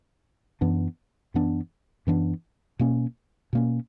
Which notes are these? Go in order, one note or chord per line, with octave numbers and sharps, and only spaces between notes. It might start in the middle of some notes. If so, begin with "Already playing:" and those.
F#2 E3 B3 D4
F#2 E3 B3 D4
F#2 E3 B3 D4
B2 A#3 C#4
B2 A#3 C#4